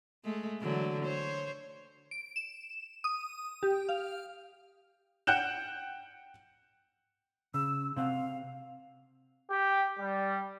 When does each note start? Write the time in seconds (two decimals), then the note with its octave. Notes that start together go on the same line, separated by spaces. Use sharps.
0.24 G#3 A3
0.61 D3 E3 F#3
1.04 C5 C#5
2.11 D7
2.36 E7
3.04 D#6
3.63 G4
3.89 F5
5.27 F#5 G5 F#6 G6 E7
7.54 C#3 E6
7.96 C3 C4 F5 F#5
9.50 G4
9.99 G3